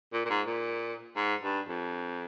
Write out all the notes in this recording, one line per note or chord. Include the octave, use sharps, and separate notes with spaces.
A#2
A#2
G#2
A#2
G#2
G2
F2